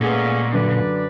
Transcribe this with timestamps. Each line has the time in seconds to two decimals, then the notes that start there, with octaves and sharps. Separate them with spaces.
0.01 A#2 G#3 A3 B3 C#4 G#4 B4
0.53 F#2 D3 B4 D5